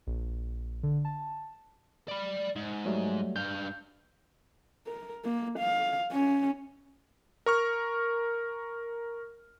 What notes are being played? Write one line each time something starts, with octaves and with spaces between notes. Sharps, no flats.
A#1
D3
A5
D5 B5
G#2
F#3 G3 A3
G2 F5 G6
A#4
A#3
F5
C#4
A#4 C#6 F6